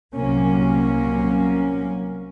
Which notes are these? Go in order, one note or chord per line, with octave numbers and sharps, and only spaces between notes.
C2 C3 F#3 A#3 C#4